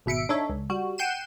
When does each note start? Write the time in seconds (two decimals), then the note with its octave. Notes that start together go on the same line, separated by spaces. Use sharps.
0.06 G#1 B2 E5 C#7 D7
0.29 D4 D#4 A4 C#5 E5
0.50 C#2
0.70 G3 F#4
0.98 F#5 G5 G6 C7 D#7 E7